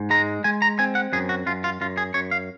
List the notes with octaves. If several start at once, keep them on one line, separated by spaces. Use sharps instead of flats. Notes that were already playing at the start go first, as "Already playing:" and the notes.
Already playing: G#2
G#3 A#5
G#3 G#5
A#5
C4 G#5
F#5
F#2 G#4
F#4
F#2 F4
F4
F#2 F4
G#4
F#2 C#5
F5